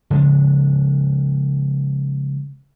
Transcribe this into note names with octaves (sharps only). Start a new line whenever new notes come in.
C#3 F3 G#3 D4